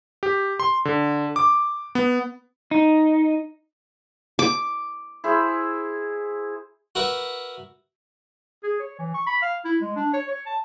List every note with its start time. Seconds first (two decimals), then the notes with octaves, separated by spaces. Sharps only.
0.23 G4
0.60 C6
0.85 D3
1.36 D6
1.95 B3
2.71 D#4
4.39 D6
5.24 E4 G#4 C5
6.95 F#4 A#4 B4 E5
8.63 G#4
8.80 C#5
8.99 E3
9.14 C#6
9.27 B5
9.42 F5
9.65 E4
9.81 G#3
9.96 D4
10.14 C#5
10.28 C#5
10.46 A5